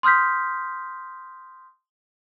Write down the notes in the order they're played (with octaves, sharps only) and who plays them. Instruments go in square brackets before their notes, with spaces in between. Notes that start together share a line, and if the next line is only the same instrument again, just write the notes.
[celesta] C6 D#6 F6 G6 B6